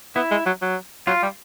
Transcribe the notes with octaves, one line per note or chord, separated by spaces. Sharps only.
B3 E4
G#3
F#3
F#3
F#3 F4
G3